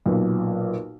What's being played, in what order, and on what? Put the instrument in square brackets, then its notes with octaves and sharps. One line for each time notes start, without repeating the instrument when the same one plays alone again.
[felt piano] B1 A#2